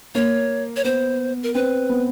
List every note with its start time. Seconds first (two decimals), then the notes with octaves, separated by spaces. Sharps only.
0.15 A#3 C#5
0.76 C#5
0.84 B3 C5
1.43 A#4
1.54 C4 B4
1.89 B3